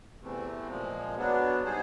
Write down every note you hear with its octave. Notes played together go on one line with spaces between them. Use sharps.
E2 C3 E3 A3 C4
A#2 F3 G#3
B2 F#3 B3 D4
G3 B3 D#4 G#4 C5